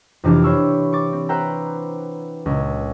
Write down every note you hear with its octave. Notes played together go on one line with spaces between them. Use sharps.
F2 C3 E3 D4 G4 F6
C5 C#5 E5 B5 C#6 E6
C#6 D6 A6
C4
B4 C5 E5 F#5 G5 A#5
C#2 A#2